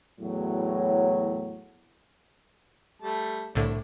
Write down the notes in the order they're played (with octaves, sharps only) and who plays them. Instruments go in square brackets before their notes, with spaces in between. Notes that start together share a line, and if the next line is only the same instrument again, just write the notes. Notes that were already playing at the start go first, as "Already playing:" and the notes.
[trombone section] E2 A2 F#3
[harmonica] G3 A3 A5
[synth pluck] C2 A2 D3 [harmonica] D4